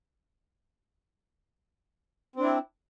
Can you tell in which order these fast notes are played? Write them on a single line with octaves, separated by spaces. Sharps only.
C4 D4 E4